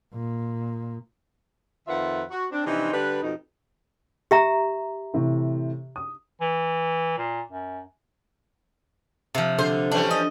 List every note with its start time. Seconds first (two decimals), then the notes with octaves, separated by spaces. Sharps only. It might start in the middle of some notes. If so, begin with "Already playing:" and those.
0.14 A#2
1.88 F2 D#3 F4 B4 E5 F#5
2.31 F#4
2.52 C4 D4
2.65 C3 E3 F3 C4 D4 D#4
2.93 D3 G3 D4 B4
3.22 F2 B2 D#4
4.31 G4 E5 A#5
5.14 A2 C3 E3
5.96 D#6
6.41 E3
7.18 A#2
7.52 F#2
9.34 C3 F3
9.58 D3 C5 C6
9.91 E3 G3 C#4 D4
10.11 D#5